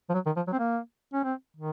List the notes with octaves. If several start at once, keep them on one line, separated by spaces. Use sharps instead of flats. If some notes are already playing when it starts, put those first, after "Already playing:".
F3
F#3
D#3
F3
F#3
C4
A#3
C#4
C4
D#3